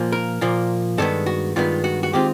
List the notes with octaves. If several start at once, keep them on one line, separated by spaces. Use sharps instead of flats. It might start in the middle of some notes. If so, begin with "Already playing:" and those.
Already playing: A#2 F3 A#3
A#4
A#2 F3 A#3
G2 D#3 G#3 B3 A4
F#4
G2 D#3 G#3 B3 F4
F#4
F#4
D#3 G#3 C4 F4 G4